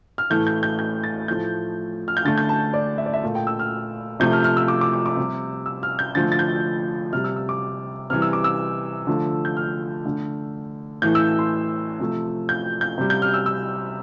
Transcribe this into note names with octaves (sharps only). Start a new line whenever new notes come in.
F6
A2 E3 A3 G6
G6
G6
G6
A6
A2 F3 A3 G6
F6
G6
D3 A3 A6
G6
A5
D5
E5
D5
E5
A#2 A3
G5
E6
F6
C3 F3 A3 G6
F6
F6
E6
D6
D6
D6
D6
C3 G3
E6
F6
G6
D3 F3 A3 A6
A6
G6
C3 G3 F6
E6
E6
D6
C3 E3 G3 F6
E6
D6
E6
D3 F3 A3
G6
F6
D3 A3
A2 E3 A3 G6
E6
C6
C3 F3 A3
G6
G6
C3 G3
G6
F6
E6
E6